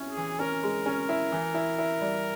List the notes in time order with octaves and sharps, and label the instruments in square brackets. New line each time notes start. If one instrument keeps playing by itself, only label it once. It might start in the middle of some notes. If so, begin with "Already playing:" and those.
Already playing: [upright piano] C#4 E4
[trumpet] G#4
[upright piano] E3
[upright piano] C#4 [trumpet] A#4
[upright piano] G#3
C#4
E4
E3
E4
E4
G3